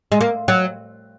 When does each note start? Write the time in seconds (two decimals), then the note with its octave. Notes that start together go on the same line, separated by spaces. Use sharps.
0.12 G#3
0.21 A#3
0.48 F#3